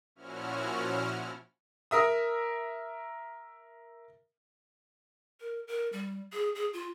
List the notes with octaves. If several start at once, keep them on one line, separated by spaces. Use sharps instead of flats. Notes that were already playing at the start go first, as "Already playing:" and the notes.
A#2 F3 C#4 E4 F#4 F6
A#4 E5 D#6
A#4
A#4
G3
G#4
G#4
F4